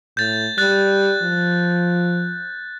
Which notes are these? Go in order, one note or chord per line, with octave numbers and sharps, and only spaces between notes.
A2 G6 A6
G3 F#6 A6
F3